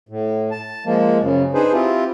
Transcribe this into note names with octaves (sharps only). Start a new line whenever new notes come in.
A2
A5
F3 G#3 A#3
F#2 C#3
D4 D#4 G#4 B4 C5
C4 E4 F4 G4